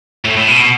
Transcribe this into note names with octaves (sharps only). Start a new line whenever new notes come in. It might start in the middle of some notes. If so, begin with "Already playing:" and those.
A2
A2
B2
B2